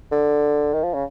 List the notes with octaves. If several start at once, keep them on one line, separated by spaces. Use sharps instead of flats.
D3
D#3
F3
C#3